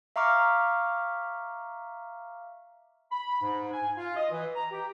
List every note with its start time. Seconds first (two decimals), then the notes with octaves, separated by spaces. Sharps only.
0.16 E5 F5 A#5 C#6 D6 F6
3.10 B5
3.41 G#2
3.72 G#5
3.97 F4
4.16 D#5
4.31 E3
4.55 A#5
4.71 G4